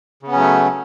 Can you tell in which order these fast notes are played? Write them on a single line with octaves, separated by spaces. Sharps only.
C#3 B3 C#4 F#3 A3